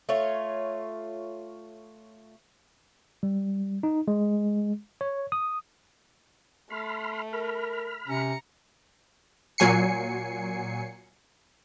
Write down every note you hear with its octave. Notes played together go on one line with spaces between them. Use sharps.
A3 F4 C#5
G3
D#4
G#3
C#5
D#6
A3 B5 C6 F6
A#4 B5 F6
C3 C#4 A#5 C#7
A#2 F#3 G#5 C7 C#7